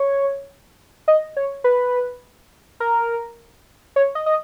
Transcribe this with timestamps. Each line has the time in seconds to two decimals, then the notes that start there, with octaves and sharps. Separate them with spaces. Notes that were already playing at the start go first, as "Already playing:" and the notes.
Already playing: C#5
1.08 D#5
1.37 C#5
1.64 B4
2.80 A#4
3.96 C#5
4.15 D#5
4.26 D#5